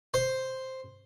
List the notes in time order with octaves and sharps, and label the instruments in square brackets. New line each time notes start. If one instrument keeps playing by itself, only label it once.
[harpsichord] C5